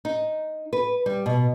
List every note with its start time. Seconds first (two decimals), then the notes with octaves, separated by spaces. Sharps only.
0.05 D#4
0.73 B4
1.06 G3
1.26 B2